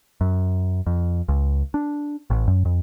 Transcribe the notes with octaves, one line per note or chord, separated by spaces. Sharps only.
F#2
F2
C#2
D4
A1
F#2
F2